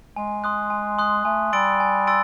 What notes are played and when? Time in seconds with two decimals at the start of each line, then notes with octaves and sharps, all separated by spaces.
0.16 G#3 G#5
0.44 C6 D#6 F#6
0.70 G#5
0.99 C6 D#6 F#6
1.25 A3 G#5
1.53 G3 C6 E6 A6 D7
1.80 G#5
2.07 C6 E6 A6 D7